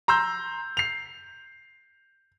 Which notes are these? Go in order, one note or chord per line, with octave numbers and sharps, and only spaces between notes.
A#5 C6 E6 G6
C7 F7